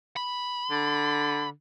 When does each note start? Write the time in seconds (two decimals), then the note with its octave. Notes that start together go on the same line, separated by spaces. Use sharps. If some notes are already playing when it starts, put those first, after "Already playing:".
0.16 B5
0.71 D3